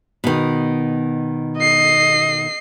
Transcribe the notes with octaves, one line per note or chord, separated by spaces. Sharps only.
B2 D#3
D#5 C7